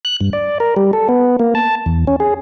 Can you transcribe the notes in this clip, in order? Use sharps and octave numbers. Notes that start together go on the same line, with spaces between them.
F#6
G2
D5
A#4
G3
A4
B3
A#3
A5
E2
C#4
G#4